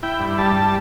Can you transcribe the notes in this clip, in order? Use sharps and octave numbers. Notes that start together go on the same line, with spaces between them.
E4 G5
G2
G3 A5